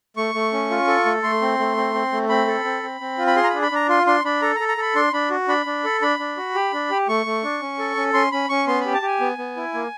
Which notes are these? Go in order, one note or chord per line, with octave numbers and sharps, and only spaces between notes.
A3 C#6
A3
C#4
F4
A4
A3
A3 C6
C4
A3
C4
C4
A3
C4 B5
A4
C4
C4
C4
F4
B5
G#4 C6
A#5
B5
D4
B5
D4 A#5
F4 C6
D4 C6
D4 B5
A4 A#5
A#5
A4
A#5
A4 B5
D4 C6
D4 B5
F#4
D4 B5
D4
A4
D4 B5
D4
F#4
G4
D4
G4
A3 C#6
A3
D4
C#4
A4
C#4
C#4 C6
C#4 B5
C#4 C#6
B3 C6
G4 B5
A5
G4 G#5
B3
B3
E4
A#3